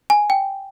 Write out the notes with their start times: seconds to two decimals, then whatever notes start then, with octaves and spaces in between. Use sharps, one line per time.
0.10 G#5
0.30 G5